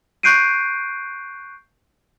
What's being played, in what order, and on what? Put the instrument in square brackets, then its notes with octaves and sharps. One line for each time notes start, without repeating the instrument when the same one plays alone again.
[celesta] C#6 F#6 G6 C7 D7 D#7